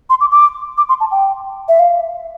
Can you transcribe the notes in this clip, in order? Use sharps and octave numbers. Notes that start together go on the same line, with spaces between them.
C6
D6
D6
D6
C6
A5
G5
E5
F5